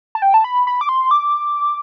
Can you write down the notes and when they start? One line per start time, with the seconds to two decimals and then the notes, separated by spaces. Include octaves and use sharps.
0.15 A5
0.22 G5
0.34 A5
0.44 B5
0.67 B5
0.81 D6
0.89 C6
1.11 D6